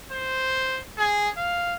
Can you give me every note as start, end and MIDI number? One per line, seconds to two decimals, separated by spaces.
0.12 0.82 72
0.98 1.29 68
1.37 1.75 77